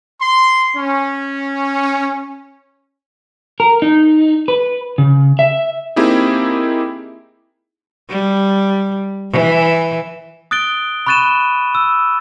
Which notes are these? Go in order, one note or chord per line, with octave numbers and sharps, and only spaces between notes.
C6
C#4
A#4
D#4
B4
C#3
E5
A#3 C4 D#4 E4 G4 G#4
G3
E3
D#6 F#6 A6 D7 G7
B5 C#6 F#6 A6 D#7 E7
E6